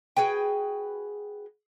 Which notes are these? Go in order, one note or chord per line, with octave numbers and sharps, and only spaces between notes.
F#4 G#4 B4 G5